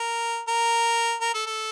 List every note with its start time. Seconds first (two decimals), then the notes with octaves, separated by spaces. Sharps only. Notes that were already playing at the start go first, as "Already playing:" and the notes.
Already playing: A#4
0.48 A#4
1.21 A#4
1.34 A4
1.47 A4